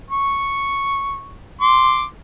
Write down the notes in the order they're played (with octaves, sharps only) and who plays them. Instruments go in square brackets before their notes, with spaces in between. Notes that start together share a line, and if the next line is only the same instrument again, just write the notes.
[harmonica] C#6
C6 D6